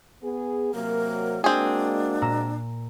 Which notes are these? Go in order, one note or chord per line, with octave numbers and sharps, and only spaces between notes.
B3 G#4
C3 F#3 A#3 A#4
G#3 A#3 C4 D4 F#4 G#4
A#2 A#5 E6